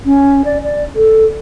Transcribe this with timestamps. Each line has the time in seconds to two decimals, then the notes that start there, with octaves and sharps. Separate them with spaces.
0.05 C#4
0.45 D5
0.64 D5
0.95 A4